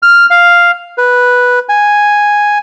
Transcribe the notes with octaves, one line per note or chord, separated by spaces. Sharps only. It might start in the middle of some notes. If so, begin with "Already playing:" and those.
F6
F5
B4
G#5